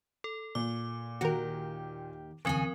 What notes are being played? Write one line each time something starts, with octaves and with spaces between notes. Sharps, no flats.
A4
A#2 D6
D#2 D#3 F#4 G4 A#4
D#2 C#3 F3 C4 A#4 G#5